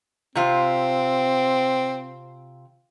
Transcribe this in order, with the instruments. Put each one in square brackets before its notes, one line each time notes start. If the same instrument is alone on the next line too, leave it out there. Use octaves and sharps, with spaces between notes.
[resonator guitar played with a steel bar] C3 F4 [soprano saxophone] C4